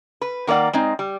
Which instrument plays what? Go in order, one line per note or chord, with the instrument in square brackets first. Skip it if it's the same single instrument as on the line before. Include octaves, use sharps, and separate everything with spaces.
[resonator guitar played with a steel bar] B4
D#3 A#3 A#4 D5 F#5
G#3 C4 D#4
G3